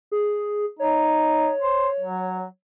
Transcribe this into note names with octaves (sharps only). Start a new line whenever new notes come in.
G#4
D#4 C#5
C5
F#3